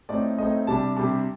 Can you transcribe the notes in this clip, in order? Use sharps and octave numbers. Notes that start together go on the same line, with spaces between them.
A2 A3 C4 D#4 D5
A2 A3 C4 D#4 D#5
C3 G3 D4 A5
C3 G3 D4